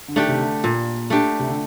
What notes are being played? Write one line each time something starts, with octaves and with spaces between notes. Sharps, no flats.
D3
D#3 A3 D4 G4
C3
D3
A#2
A3 D4 G4
C3
D3